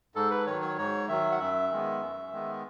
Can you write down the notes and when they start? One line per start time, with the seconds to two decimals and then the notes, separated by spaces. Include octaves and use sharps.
0.15 G#2 A4
0.31 B4
0.46 D#3 F#3 C#5
0.62 C#5
0.78 G#2 C#5
1.08 D#3 F#3 E5
1.31 F#5
1.40 F#2 E5
1.71 D#3 G#3 B3
2.02 F#2
2.32 D#3 G#3 B3